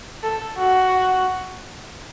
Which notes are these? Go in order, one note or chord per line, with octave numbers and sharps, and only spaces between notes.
A4
F#4